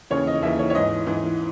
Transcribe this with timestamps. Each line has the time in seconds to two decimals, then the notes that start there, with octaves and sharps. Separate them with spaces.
0.10 D#2 C#3 E3 C#5
0.27 D#5
0.42 D#2 C#3 E3 E5
0.59 C#5
0.70 C#5
0.75 G#2 E3 D#5
1.07 G#2 E3